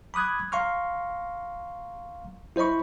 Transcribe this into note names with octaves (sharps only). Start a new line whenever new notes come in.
B5 D6 D#6 F#6 G#6
F5 A#5 C6 C#6 F6
E4 C5 D#5 B5 C#6